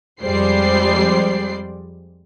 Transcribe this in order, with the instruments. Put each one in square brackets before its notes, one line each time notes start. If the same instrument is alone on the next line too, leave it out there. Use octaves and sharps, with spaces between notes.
[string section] F2 G3 G#3 C5 D5 C7